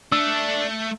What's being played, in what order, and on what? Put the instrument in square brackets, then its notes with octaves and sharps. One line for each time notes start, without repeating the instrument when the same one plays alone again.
[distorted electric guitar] A3 [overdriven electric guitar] D4 [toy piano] E6